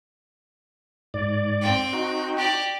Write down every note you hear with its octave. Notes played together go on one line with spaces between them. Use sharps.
G#2 D5
C4 G5
D#4 F#4
G4 D5